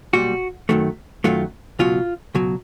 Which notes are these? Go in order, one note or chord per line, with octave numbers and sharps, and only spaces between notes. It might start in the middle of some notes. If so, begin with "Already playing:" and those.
B1 A#2 G3 F#4
F#2 D#3 F#3 A3
F#2 D#3 F#3 A3 F4
C#2 B2 F#3 F4
C#2 B2 F#3